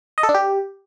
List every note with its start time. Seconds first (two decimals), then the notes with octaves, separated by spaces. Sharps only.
0.18 D#5
0.23 A4
0.29 D4
0.34 G4